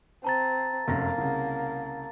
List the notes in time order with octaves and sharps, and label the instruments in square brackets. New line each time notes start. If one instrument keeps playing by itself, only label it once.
[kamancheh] C4 [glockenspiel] A5 A#5 A6
[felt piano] F1 F#2 A#6 [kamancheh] A#3
[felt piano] C2 C#3